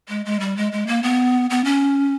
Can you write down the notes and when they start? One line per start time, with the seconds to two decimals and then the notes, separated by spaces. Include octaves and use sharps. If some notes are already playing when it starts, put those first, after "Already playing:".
0.09 G#3
0.25 G#3
0.40 G3
0.57 G#3
0.72 G#3
0.87 A#3
1.03 B3
1.50 B3
1.64 C#4